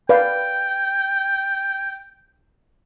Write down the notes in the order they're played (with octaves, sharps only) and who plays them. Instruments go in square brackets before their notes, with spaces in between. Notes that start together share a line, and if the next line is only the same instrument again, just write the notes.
[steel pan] B4 D5 F5 [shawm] G5